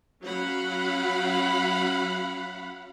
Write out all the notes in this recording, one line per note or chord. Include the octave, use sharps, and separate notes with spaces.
F#3 C#4 F5 F#5 B5